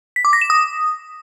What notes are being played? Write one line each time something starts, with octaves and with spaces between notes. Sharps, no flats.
B6
D6
A#6
E7
D#6